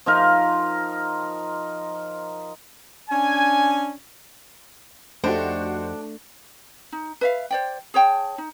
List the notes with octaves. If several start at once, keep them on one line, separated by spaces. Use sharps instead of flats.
F3 D#4 A#4
C#4 D4 G#5
F2 A3 D4 D#4 F#4 G4 C5
D#4
B4 E5 F5
C5 D5 G5
G#4 C#5 G5 A5
D#4